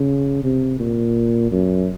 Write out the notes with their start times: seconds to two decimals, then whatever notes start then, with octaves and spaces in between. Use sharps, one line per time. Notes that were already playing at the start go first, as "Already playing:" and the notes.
Already playing: C#3
0.44 C3
0.80 A#2
1.51 F#2